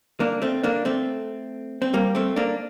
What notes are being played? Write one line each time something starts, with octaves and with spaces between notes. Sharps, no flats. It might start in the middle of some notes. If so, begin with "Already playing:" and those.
A#3 D4
A3 C4
A#3 D4
A3 C4
C4
G3 A#3
A3 C4
A#3 D4